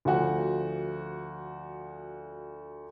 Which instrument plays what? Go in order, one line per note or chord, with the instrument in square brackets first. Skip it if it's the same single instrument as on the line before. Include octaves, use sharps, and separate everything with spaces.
[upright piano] D2 F3 F#4 F#5